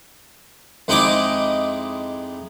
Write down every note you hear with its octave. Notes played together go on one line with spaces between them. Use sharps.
F2 G#3 D#4 E4 D#5 D6